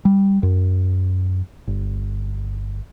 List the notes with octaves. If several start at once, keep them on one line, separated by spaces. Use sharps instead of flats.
G3
F#2
G1